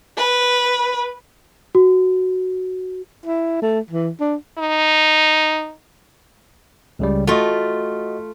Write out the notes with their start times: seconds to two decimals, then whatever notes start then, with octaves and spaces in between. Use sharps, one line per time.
0.17 B4
1.75 F#4
3.26 E4
3.62 A3
3.91 E3
4.20 D4
4.58 D#4
6.99 C#2 C#3 G3
7.27 A3 F4 F#4 D#5